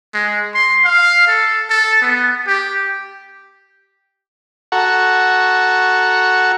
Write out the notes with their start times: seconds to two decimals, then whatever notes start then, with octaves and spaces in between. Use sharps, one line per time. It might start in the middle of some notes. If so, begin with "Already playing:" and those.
0.14 G#3
0.54 C6
0.85 F5
1.28 A4
1.70 A4
2.01 B3
2.47 G4
4.72 F#4 A4 F#5 A#5 C#6